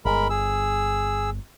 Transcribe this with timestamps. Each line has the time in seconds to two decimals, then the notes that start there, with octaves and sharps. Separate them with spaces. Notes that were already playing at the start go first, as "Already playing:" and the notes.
0.05 G1 G#3 A#4 B5
0.30 G#4 E6